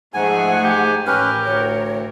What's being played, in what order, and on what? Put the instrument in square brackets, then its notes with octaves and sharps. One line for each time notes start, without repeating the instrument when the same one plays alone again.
[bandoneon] G#2 G#5 [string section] F3 A3 G#4 [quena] F#5
[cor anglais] G4
[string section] A1 A#4 [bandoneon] C#4 B4 [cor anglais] G4 [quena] F6
[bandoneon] D2 [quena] C#5